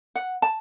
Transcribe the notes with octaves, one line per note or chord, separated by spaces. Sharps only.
F#5
A5